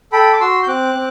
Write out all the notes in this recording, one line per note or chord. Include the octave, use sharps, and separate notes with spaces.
A4 G5 B5
D6
F#4 C6 E6
G6
C4 D6 F#6
C4